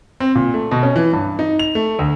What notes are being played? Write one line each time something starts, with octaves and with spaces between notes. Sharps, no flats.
C4
A#2
A3
B2
C#4
E3
G2
D#4
F7
A3
D2